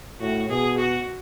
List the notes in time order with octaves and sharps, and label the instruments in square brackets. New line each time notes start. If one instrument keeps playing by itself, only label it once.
[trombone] A2 [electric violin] F#4
[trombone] B2 [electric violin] G#4
[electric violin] F#4